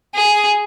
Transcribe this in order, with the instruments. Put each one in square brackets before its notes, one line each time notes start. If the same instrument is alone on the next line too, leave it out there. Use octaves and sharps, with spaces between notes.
[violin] G#4